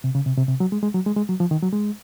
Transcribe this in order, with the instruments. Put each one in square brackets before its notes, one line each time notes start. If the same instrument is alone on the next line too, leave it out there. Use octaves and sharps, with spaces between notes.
[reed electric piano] C3
C#3
C3
C3
C3
F#3
G#3
G#3
F#3
G#3
G#3
F#3
F3
D#3
F#3
G#3